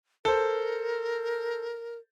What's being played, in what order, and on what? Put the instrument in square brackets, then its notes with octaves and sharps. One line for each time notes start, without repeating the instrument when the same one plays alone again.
[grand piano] A4 C5 [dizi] A#4